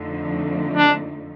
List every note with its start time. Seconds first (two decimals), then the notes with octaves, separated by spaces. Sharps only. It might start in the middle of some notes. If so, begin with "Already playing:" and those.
Already playing: F2 D3 F3 A3 D#4
0.76 D4